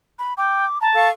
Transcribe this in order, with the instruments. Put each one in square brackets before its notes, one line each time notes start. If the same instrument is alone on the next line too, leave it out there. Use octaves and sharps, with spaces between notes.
[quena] B5
[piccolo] G5 [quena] D6
[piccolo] A5 [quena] A#5
[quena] A4 [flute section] F5 C#6